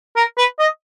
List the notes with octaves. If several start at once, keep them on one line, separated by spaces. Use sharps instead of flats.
A#4
B4
D#5